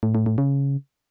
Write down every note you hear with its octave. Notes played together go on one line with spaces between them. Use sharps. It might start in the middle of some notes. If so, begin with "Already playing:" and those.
A2
A2
A2
C#3